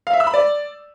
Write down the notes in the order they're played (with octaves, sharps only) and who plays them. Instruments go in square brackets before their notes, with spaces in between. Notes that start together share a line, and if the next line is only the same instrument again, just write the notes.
[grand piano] F5
E5
E6
B5
D5